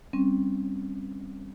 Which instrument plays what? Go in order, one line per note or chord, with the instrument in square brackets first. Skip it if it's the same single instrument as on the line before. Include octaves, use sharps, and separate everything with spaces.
[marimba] G3 C4 C#4